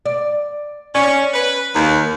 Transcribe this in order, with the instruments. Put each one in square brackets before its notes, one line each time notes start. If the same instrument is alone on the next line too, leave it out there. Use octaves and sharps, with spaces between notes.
[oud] D5
[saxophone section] C#4 [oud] D5
[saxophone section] B4
D#2